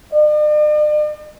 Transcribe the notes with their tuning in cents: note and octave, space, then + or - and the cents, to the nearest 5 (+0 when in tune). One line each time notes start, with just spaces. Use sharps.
D5 +45